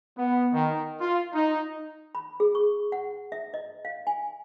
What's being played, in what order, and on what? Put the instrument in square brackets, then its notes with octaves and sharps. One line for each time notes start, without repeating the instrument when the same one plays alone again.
[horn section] B3
D#3
F4
D#4
[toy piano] B5
G#4
C#6
F#5
E5
D#5
F5
G#5